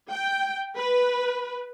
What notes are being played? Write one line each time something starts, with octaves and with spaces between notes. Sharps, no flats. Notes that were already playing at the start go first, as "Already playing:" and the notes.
G5
B4